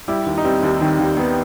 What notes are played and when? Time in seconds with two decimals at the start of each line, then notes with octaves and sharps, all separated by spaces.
0.08 G3 E4 G4
0.26 D#2
0.38 D#4
0.44 G3 C4
0.63 D#2
0.81 D#3 C4
0.99 D#2
1.17 D#3 B3